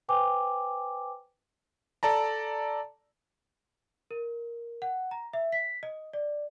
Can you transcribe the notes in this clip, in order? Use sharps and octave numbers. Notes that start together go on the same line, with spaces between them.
B4 C5 G5 G#5 D6
A4 D5 A5 A#5
A#4
F#5
A#5
E5
B6
D#5
D5